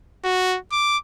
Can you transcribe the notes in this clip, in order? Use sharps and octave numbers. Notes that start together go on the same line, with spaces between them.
F#4
D6